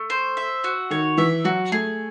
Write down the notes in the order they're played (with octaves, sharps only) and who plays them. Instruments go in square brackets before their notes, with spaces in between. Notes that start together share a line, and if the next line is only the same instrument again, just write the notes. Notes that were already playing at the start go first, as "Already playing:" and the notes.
Already playing: [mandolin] A3
C5
E5
F#4
[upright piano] D#3 [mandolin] C#5
[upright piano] E3 [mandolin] E5
[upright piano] F#3 [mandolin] F#4
[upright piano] A3 [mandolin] G#4